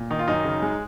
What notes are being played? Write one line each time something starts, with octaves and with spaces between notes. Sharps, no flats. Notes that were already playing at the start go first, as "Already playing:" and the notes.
Already playing: A#2
D#3 D#4
F4
F#2 D#4
C#3
G#3